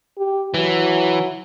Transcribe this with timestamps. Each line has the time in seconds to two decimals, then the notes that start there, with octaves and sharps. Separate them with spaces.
0.18 G4
0.54 E3 F#3